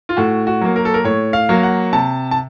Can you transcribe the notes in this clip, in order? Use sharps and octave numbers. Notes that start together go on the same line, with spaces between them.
F4
A2 F#4
F#4
F#3 A#3
A#4
A4
A#4
A2 C#5
F5
F#3 A#3
F#5
C3 A5
A5